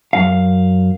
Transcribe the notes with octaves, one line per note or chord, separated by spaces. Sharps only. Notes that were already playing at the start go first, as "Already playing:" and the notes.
F#2 F5